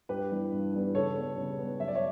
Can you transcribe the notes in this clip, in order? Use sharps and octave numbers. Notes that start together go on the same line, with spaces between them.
G2 G4 B4
E3 G3 B3
G2
E3 G3 B3
C#3 A4 C#5
G3 B3
C#3
G3 B3
F#2 E5
D5
C#5 E5